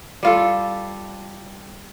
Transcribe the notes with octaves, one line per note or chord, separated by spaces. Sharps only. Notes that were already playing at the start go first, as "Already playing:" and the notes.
G3 F4 A4